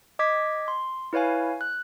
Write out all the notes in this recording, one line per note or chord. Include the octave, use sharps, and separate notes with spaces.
D#5 D6 G#6 B6
C6
E4 B4 C#5 F5 G#5
F#6